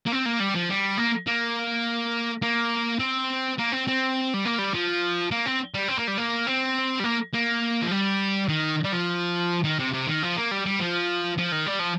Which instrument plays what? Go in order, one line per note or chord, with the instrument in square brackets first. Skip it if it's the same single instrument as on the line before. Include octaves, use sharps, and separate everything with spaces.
[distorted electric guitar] A#3
C4
A#3
G3
F3
G3
A#3
A#3
A#3
C4
A#3
C4
C4
G3
A#3
G3
F3
A#3
C4
G3
C4
A#3
G3
A#3
C4
G3
A#3
A#3
F3
G3
D#3
G3
F3
D#3
C3
C3
D#3
F3
A#3
G3
G3
F3
F3
D#3
G3
F3